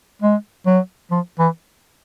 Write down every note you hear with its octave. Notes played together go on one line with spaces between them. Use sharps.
G#3
F#3
F3
E3